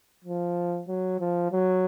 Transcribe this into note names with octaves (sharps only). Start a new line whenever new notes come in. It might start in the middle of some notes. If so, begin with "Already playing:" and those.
F3
F#3
F3
F#3